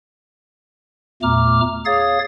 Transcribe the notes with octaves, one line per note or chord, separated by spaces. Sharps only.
E2 A#2 A3 A#5 D6 F6
G#4 C#5 F5 D#6 A6